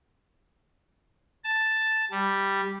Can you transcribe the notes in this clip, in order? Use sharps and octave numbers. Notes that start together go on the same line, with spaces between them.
A5
G3